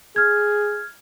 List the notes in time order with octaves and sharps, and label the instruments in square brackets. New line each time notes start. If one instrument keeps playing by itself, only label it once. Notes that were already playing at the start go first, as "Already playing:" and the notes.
[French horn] G#4 [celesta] F6 G#6